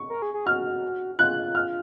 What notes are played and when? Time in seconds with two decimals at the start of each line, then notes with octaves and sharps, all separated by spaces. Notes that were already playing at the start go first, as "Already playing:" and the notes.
Already playing: C#6
0.10 A#4
0.22 G#4
0.34 G#4
0.46 F#4 F6
1.18 F4 F#6
1.55 F6